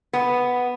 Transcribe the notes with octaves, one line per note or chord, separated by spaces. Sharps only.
B3